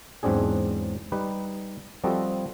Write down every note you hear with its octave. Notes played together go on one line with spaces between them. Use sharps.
E2 G#2 F#3 C4 D4 G#4
G3 D#4 G4 B4
F3 G3 C4 F#4 A4 D#5